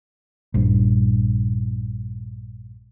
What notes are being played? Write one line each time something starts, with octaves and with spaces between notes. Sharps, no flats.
A#1 G2